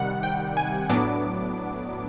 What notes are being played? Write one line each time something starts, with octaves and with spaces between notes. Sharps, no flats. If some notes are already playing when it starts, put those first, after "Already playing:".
Already playing: C3 D#3 G3 F#5
G5
G#5
A2 F#3 B3 D4 D6